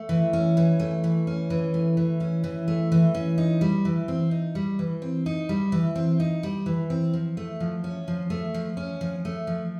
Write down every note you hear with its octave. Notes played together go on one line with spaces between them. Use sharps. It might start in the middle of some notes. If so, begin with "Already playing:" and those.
Already playing: A3
E3
C#4
E3
A3
E3
C#4
E3
A3
E3
C#4
E3
A3
E3
C#4
D#4
G3
E3
C4
D#4
G3
E3
C4
D#4
G3
E3
C4
D#4
G3
E3
C4
F3
A3
F3
C#4
F3
A3
F3
C#4
F3
A3
F3